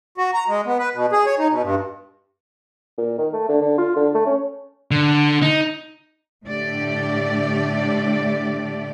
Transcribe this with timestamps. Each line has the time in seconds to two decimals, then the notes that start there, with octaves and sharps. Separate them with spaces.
0.18 F#4
0.34 A#5
0.48 G#3
0.66 B3
0.79 B4
0.95 B2
1.12 G#4
1.26 C#5
1.39 D#4
1.50 B2
1.62 G2
2.98 A#2
3.18 D#3
3.33 A3
3.49 D3
3.62 D3
3.78 F4
3.96 D3
4.15 A3
4.26 C#4
4.91 D3
5.42 D#4
6.45 A2 D3 A3 G4 D5